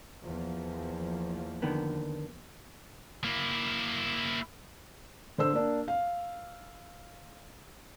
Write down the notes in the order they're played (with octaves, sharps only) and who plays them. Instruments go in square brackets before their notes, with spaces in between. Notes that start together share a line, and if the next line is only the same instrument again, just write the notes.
[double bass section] E2 F3 A#3
[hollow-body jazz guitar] D3 D#3 B3
[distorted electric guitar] A#3 E4
[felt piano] D3 C5 E6
A#3 D4
F5